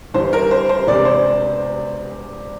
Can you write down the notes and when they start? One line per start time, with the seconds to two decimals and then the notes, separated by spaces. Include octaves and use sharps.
0.14 G1 G2 E3 C5
0.33 A#4
0.51 C5
0.69 C5
0.87 E1 E2 C3 D5
1.05 C5